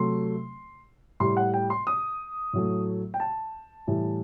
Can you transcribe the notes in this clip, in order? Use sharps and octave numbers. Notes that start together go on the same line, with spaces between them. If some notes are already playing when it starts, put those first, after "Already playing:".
Already playing: C3 F#3 A3 C6
A2 G3 C6
F#5
G5
C6
D#6
A2 F#3 A3
G5
A5
A2 E3 G3